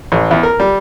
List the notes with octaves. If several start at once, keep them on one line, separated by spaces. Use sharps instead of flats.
A1
E2
A#4
G3